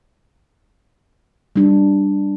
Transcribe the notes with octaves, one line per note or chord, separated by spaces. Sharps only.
G3 D4